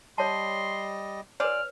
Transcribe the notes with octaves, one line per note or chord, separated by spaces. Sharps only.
G3 C#5 D#5 A5 C6
F4 G#4 B4 C#5 D5 F6